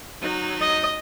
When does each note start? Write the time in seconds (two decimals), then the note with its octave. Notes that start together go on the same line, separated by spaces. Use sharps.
0.21 F#3 D#4
0.61 D#5